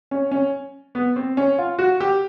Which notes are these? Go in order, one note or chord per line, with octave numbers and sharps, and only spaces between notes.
C#4
C#4
B3
C4
C#4
F4
F#4
G4